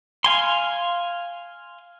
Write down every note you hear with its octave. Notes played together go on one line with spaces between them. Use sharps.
F5 G#5 C6